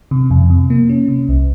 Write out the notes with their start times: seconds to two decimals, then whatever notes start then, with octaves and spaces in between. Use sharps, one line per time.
0.11 C3
0.30 F2
0.50 C3
0.70 A#3
0.89 C#4
1.08 C3
1.29 C2